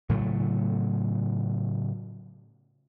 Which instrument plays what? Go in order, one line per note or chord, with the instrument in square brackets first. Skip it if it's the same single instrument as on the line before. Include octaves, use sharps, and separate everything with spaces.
[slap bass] A2 C#3 F#3 A3